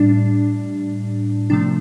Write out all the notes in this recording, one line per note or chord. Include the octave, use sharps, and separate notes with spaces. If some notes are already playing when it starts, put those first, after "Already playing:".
Already playing: A2 G3 D4
C3 F3 A3 D4